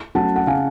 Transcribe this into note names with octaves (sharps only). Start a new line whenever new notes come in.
F#3 A3 C#4 F#5 A5
F#5
C#3 F5 G#5